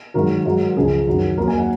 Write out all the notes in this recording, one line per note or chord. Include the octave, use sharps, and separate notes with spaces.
G#2 D#3 F#3 A#4
G#2 F#3
C#2 C#3 F3 G#4
F#2 D#3 F#3
D#2 D#3 F#3 A#4
G#5
F#5